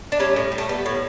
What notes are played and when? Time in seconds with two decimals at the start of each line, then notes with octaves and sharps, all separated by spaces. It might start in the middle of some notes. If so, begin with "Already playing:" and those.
0.12 D4
0.19 G3 A3 C#4
0.36 A2
0.52 G3
0.58 A3
0.69 G3 B3
0.86 A2